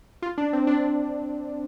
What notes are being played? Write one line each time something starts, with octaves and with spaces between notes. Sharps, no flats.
F4
D4
C4
D4